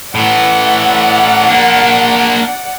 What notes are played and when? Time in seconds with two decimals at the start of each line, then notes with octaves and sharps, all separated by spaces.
0.15 A2 E3 D5 F#5
1.48 A#3 D4